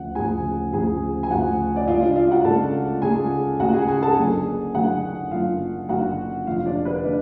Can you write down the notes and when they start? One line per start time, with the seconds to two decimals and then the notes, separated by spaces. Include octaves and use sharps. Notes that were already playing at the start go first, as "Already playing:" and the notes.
Already playing: D2 C#3 F3 F#5
0.15 D2 C#3 F3 G#4 G#5
0.73 D2 C#3 F3 G#4 G#5
1.23 G#5
1.30 D2 C#3 F3 F#4 F#5
1.76 D5
1.87 C#2 C#3 G#3 F4 F5
2.01 D4 D5
2.16 F4 F5
2.31 F#4 F#5
2.44 C#2 C#3 G#3 A4 A5
3.02 C#2 C#3 G#3 G#4 G#5
3.59 C#2 C#3 G#3 F#4 F#5
3.74 G#4 G#5
3.88 G#4 G#5
4.03 A4 A5
4.17 F#1 F#2 D3 G#4 G#5
4.74 F#1 F#2 D3 F#4 F#5
5.31 F#1 F#2 D3 F4 F5
5.89 F#1 F#2 D3 F#4 F#5
6.46 F1 F2 D3 F4 F5
6.65 D4 D5
6.85 B4
7.04 D3 D4 D5